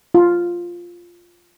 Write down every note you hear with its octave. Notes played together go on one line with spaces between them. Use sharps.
F4